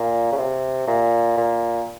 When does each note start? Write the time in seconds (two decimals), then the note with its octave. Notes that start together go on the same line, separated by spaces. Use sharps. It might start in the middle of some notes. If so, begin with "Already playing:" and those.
Already playing: A#2
0.32 C#3
0.38 C3
0.88 A#2
1.37 A#2